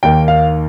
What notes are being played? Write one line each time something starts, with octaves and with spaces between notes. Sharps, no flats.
D#2 D#3 A#3 G5
F5